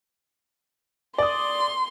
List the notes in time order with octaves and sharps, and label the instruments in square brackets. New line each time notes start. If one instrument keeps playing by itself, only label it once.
[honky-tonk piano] D5 D#6 [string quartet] C6